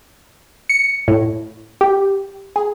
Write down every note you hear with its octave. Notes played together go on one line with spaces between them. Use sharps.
C#7
A2
G4
G#4